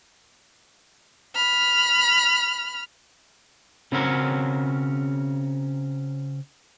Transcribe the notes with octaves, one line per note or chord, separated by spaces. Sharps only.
B5 F6
C#3 C4 C#4 F#4 A#4